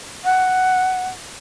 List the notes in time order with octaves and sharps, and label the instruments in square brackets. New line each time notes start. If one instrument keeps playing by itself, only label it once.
[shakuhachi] F#5